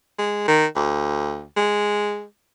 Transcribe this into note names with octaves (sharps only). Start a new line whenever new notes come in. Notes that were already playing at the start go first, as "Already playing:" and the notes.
G#3
D#3
D2
G#3